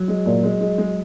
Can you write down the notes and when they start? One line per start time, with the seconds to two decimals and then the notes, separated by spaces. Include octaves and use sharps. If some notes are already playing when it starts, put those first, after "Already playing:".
Already playing: F#3
0.08 G#3
0.26 A#2
0.43 G#3
0.61 G#3
0.78 G#3